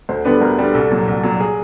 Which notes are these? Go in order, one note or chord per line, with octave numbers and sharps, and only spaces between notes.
D2 C5
D3 G3 B3 D4 B4
D2 A#4
D3 G3 B3 D4
C2 A4
A#2 F#3
C2
A#2 F#3
G#4